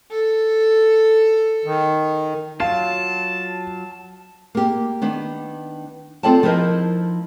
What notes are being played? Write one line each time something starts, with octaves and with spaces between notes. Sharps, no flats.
A4
D#3
F#3 F4 F5 A5
A#3 G4
D#3 B3 D4
C4 F4 A4 D5 G5 A5
F3 D#4 E4 A#4 C5 D#5